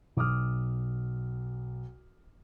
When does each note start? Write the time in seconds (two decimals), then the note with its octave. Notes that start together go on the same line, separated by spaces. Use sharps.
0.17 B1 D6 D#6 F6